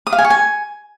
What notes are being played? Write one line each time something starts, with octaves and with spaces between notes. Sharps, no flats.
D#6
F5
G#5
C#6
G#5